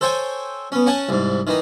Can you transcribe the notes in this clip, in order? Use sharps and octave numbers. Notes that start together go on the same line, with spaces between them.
A4 C5 C#5 G5 G#5
B3 C#4
C#4 F#5 G#5 A5
C2 G#2
D#3 E3 D#4